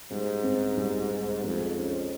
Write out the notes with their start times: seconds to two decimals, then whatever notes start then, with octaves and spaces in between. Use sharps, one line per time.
0.11 G#2 G3
0.44 C4
0.77 G3
1.11 D#4
1.44 F2 G#3
1.78 C#4